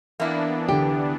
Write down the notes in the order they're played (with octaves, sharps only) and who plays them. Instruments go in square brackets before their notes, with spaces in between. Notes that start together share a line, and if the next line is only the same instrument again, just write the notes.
[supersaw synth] E3 B3 D4 [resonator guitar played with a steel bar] A#3 E4
[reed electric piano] C2 D3 [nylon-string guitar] G4